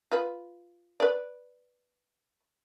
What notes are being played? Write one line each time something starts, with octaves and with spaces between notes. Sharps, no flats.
F4 B4
B4 D5